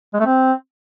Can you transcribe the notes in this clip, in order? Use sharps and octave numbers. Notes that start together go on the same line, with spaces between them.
G#3
A3
C4